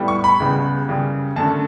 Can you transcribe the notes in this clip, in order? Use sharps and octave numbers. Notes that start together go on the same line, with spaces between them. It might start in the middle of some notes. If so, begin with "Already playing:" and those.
Already playing: A2 G3 B3
C#6
B5
C#2 C#3 G3 B3
F#2 C#3 G3
F#2 D3 A3 A5